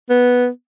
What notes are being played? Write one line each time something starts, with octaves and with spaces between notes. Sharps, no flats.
B3